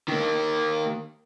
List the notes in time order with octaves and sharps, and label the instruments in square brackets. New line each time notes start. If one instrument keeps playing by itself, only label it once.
[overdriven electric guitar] D#3 A#3